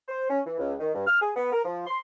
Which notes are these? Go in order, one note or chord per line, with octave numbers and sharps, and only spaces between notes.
C5
C#4
E3
C#2
D#3
G2
F6
G#4
B3
A#4
F3
C6